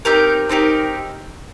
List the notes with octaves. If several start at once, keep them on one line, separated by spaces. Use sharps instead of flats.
C4 D#4 G4 A#4
C4 D#4 G4 A#4